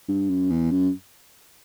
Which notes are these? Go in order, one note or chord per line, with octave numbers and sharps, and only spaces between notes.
G2
F#2
E2
F#2